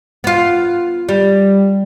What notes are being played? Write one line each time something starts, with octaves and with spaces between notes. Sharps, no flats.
B3 F4
G3